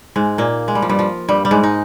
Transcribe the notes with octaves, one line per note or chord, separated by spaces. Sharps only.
G#2 G#3
A#2 A#3
G#3
G3
F3
G2 G3
F3
G2 G3
G3
G#2 G#3
D#4